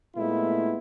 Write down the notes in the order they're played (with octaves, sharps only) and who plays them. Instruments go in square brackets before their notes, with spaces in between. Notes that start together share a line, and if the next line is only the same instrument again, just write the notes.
[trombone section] A#2 G#3 A3 B3 E4 F4